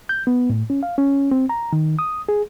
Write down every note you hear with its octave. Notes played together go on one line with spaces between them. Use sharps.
G6
B3
A2
C#4
F5
C#4
C4
A#5
D#3
D#6
G#4